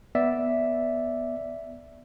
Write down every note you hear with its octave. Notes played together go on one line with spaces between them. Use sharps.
B3 D5 E5